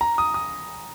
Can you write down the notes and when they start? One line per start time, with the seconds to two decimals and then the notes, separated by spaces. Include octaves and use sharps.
0.01 A#5
0.18 D#6
0.34 D#6